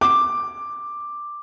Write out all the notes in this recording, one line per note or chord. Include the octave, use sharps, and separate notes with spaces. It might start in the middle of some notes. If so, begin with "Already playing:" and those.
D6